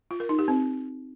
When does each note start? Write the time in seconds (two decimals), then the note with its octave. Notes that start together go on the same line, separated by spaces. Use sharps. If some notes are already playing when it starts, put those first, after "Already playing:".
0.11 F4
0.20 A#4
0.29 D#4
0.39 G4
0.48 C4